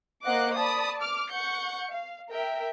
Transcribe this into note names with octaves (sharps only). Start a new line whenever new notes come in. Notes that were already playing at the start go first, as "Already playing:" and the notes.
A#3 C5 D#5 F#5 D6 F#6
D5 A5 B5 D#6
D6 F6
F#5 C#6 G6 C#7
F5
A#4 E5 G5